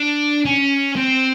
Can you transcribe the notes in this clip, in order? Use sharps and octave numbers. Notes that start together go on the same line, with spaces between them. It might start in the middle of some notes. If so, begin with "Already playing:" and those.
Already playing: D4
C#4
C4